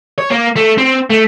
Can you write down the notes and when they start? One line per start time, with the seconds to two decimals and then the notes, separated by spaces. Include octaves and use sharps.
0.18 C#5
0.30 A#3
0.56 A3
0.78 C4
1.10 A3